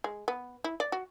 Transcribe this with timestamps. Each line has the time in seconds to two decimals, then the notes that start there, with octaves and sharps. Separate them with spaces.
0.04 G#3
0.28 B3
0.64 E4
0.80 D5
0.92 F#4